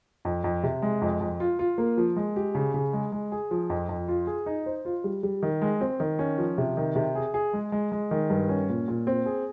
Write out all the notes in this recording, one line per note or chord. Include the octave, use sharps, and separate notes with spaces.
F2
F2
C3
G#3
F2
F2
F4
F4
A#3
F3
G#3
G4
C#3
C#3
G#3
G#3
G#4
F3
F2
F2
F4
G#4
D#4
C5
F4
G3
G3
D#3
G#3
C4
D#3
C#4
F3
C3
D#3
C3
G#4
G#4
G#3
G#3
G#3
D#3
G2
C#4
A#2
A#2
C4
G#4